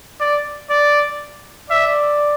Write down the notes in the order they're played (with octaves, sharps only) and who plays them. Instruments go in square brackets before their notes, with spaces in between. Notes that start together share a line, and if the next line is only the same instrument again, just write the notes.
[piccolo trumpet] D5
D5
[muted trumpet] D5 [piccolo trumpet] E5